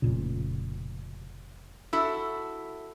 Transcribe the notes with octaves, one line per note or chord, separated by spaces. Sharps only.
F1 A#2 C#3
E4 F#4 A4